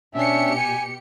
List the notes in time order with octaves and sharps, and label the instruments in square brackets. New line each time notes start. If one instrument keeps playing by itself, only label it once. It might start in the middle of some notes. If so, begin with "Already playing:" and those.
[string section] B2 G4 C#7 [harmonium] C#4 D4 E5
[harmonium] G#5